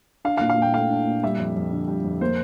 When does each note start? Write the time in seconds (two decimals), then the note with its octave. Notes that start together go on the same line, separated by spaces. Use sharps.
0.25 D4 F5
0.37 F5
0.41 A#2
0.49 F5
0.57 A#2 G5
0.74 A3 F5
0.90 D4
1.07 A#2
1.23 G3 E5
1.39 F2
1.56 F2
1.73 D3
1.88 G3
2.05 F2
2.21 A#3 C5